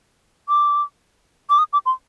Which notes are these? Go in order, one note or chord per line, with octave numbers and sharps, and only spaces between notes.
D6
D6
D#6
D6
C6